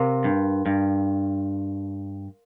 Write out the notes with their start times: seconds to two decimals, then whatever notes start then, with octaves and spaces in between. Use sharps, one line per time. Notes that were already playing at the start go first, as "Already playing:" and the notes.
Already playing: C3 A#4 F5 C6
0.24 G2
0.66 G2